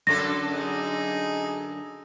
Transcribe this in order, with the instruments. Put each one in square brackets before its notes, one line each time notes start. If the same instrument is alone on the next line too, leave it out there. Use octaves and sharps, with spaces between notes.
[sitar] F#2 D3 A4 [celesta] A#6
[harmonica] D#4 G#4 D#5